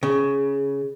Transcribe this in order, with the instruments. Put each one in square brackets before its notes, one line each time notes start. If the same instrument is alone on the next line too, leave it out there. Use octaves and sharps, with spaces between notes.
[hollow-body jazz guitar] C#3